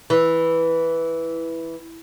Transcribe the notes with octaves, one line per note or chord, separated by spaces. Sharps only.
E3